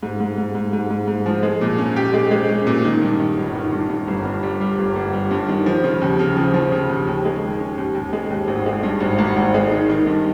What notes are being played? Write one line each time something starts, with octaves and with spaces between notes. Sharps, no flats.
G#2
G#2
G#2
G#2
G#2
G#2
G#2
F3
G#3
A#2
C#4
G4
G#3
G#3
C#4
A#2
D#3
G2
D#3
G1
D#3
G2
G2
G1
G2
G3
G3
G1
G1
G3
G2
D#3
F3
C#3
D#2
C#3
F3
F3
C#3
D#2
D#2
G#3
D#3
C#4
D#2
D#2
G#3
D#2
G#1
G#3
G2
G#1
G#1
G#1
G#3
D#3
D#3
G2